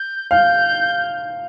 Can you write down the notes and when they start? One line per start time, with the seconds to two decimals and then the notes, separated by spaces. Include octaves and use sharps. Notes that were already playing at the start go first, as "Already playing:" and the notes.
Already playing: G6
0.31 F5 G6